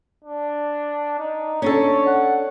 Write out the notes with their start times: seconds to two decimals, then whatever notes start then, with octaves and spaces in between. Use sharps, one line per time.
0.24 D4
1.19 D#4
1.62 C#4 D4 A4 C#5
2.06 F#5